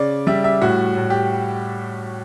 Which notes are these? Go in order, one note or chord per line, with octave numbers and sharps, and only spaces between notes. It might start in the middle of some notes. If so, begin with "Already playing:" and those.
Already playing: C#3 D5
G3 E5
E5
A2 F#4
A2
G4